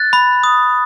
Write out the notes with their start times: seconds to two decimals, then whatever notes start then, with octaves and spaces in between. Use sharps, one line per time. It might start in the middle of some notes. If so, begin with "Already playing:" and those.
Already playing: F#6 A6
0.13 B5
0.43 D#6